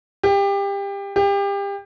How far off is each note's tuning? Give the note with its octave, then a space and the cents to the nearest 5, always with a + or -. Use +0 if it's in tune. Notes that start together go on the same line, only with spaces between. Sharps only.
G4 +25
G4 +30